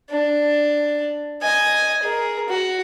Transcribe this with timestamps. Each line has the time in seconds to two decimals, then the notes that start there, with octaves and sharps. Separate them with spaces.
0.10 D4
1.42 D#5 G#5
2.02 G#4 A#4
2.49 F#4